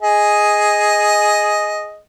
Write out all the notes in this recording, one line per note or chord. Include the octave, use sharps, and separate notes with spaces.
G#4 D#5